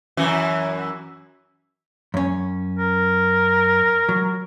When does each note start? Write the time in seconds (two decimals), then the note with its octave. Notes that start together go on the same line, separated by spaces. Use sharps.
0.17 F#2 E3 F#4
2.14 F#2 C#4
2.79 A#4
4.09 F#3